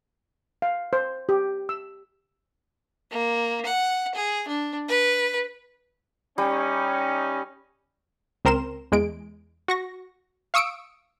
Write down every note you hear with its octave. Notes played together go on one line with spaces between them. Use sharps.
F5
C5
G4
E6
A#3
F#5
G#4
D4
B4
G3 C#4 D#4
C#2 C4 A#4 C6 E7
E2 G#3 D7
F#4 C#6 A#6
F5 C#6 D#6 E6 C#7 D7